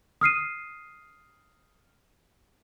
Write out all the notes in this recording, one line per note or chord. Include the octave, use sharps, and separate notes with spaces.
D#6 F6 C7 D#7